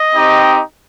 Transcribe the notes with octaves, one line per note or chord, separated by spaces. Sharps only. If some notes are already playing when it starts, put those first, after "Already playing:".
Already playing: D#5
C4 D#4 G4